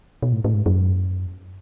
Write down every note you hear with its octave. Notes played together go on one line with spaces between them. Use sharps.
B2
A2
A2
G#2
F#2